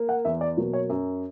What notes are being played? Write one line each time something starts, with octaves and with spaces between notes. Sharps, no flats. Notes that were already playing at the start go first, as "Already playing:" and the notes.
Already playing: A#3
F#5
E2 E5
D5
B2 F#3 A#3
C#5
F#2